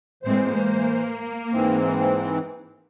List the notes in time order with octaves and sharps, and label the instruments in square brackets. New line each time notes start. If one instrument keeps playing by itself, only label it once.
[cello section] A2 G#3 C4 [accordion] E3 C5
[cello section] A#3
[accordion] G#2 E3 C4